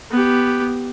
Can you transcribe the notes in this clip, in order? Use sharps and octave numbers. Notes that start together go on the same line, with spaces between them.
B3 G4